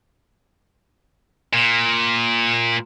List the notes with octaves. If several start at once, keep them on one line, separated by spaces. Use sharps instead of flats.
A#2